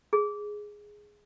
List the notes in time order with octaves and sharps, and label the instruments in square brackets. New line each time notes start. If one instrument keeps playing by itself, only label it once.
[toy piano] G#4